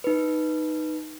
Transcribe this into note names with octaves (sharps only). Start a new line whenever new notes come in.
D#4 B4